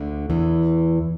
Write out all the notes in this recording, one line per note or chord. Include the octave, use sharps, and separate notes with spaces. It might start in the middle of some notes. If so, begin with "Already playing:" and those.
Already playing: D2 D3
E2 E3